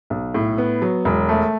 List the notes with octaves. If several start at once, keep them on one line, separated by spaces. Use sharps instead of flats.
B1
A2
B3
F#3
E1
A3